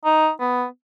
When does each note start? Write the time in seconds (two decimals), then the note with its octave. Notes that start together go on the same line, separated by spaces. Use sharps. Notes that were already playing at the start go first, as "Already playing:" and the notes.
0.05 D#4
0.40 B3